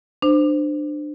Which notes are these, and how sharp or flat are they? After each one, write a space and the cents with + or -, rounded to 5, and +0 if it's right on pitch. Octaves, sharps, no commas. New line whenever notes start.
D4 +25 C5 -15